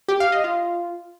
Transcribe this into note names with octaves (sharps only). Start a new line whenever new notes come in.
G4
F5
D#5
F4